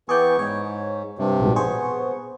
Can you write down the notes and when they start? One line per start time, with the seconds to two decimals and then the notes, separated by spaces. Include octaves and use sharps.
0.09 E3 B3 G#4 D5 G5 C#6
0.39 G#2 C#5
1.19 G2 C3
1.40 A#1 G#2 B2
1.56 B3 G#4 C5 C#6